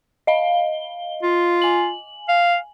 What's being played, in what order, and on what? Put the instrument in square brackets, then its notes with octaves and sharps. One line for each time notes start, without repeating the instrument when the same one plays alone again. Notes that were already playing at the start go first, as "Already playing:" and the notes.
[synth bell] D#5 F5 G7
[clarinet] F4
[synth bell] G#5 F#7
[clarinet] F5